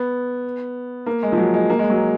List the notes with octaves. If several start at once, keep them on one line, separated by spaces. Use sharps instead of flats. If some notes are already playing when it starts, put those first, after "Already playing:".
Already playing: B3
A#3
G#3
F3
F#3
G#3
A#3
G#3
F#3